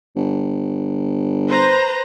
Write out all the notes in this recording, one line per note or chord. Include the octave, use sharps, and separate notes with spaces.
G1
B4 C5 A#5